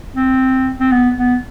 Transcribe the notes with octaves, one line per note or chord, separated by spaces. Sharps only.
C4
C4
B3
B3